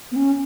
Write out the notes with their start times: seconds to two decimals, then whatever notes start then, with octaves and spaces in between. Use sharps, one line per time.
0.11 B3
0.15 C#4